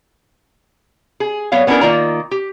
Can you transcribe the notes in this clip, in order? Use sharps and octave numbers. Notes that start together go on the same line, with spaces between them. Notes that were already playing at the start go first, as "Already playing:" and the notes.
G#4
F#3 B3 C#5 F5
B3 C#4 D4 E4 A#4
D#3 A#3 F4 D5 A#5
G4